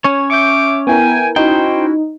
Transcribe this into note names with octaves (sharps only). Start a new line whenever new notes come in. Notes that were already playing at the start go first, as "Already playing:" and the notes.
C#4 C#5
E5 C#6 D6 G6
B3 E4 A#4 G5 G#5
C#4 D#4 E4 F#4 C5 G5